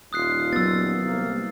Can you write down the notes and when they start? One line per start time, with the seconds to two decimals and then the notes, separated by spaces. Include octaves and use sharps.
0.13 D#1 F4 D#6 F#6 C7
0.53 F#3 B3 E6 A6
1.01 C2 A#3